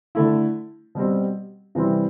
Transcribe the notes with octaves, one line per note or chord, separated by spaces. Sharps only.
D3 A3 E4
B2 G3 C4
C3 E3 G3 C4